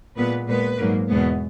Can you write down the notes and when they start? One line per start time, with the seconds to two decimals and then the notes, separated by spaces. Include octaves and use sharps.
0.16 A#2 G#3 B3 B4
0.47 A#2 G#3 B3 B4
0.78 G#2 F#3 A#3
1.09 E2 B2 G#3 B3